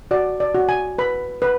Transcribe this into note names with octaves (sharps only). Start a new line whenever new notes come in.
F#4 D5
D5
F#4
G#5
B4 B5
B4